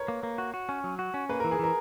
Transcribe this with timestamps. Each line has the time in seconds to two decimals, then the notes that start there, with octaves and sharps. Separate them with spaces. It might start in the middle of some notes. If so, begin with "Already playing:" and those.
Already playing: A#4 B4 C#5
0.08 A#3
0.23 A#3
0.38 F#4
0.54 F#4
0.69 C#4
0.84 F#3
0.99 F#4
1.14 C#4
1.29 A#3 B4
1.40 A#4
1.44 E3
1.51 G#4
1.59 E3 A#4